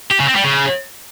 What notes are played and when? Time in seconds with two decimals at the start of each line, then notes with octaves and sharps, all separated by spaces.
0.11 G4
0.19 C#3
0.27 C4
0.35 G3
0.43 C#3